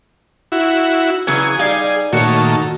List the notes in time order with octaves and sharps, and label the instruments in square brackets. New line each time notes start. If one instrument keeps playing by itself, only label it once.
[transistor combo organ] E4 F#4
[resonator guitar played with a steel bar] C#3 E3 F#3 [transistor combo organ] G#4
[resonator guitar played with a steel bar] G3 D#4 F5
[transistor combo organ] A#2 D#3 A3 [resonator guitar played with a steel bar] F#4 C#5